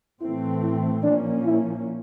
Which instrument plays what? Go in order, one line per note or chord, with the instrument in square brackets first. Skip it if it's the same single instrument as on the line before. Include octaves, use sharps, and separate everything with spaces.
[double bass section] A2 E3 A3 C4 [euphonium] E4
[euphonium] E4
[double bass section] A#2 F3 A#3 C#4 [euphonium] D4
[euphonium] E4